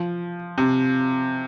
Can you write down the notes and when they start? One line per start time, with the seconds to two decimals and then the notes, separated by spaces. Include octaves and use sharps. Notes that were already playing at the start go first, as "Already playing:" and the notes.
Already playing: F3
0.58 C3